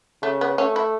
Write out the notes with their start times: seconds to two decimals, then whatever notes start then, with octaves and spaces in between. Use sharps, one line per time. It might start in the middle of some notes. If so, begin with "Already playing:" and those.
0.23 C#3 A3
0.41 B3
0.58 A3 C#4
0.76 E4